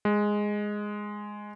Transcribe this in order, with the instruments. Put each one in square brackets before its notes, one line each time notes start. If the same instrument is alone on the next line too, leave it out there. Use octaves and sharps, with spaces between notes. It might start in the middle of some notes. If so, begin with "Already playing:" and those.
[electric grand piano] G#3